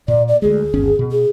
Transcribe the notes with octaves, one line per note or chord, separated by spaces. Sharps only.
A#2 D5
D5
D2 G#3 G#4
G1 D#2 C#4
B2
G#4